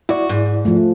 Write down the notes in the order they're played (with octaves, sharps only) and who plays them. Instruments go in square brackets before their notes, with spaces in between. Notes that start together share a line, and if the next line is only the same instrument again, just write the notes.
[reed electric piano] E4 D5 [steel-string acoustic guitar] F#4
[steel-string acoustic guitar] G#2
[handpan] F3 A3